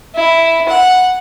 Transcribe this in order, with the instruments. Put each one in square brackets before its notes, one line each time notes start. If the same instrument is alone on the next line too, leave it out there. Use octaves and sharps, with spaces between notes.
[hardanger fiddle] E4
F#5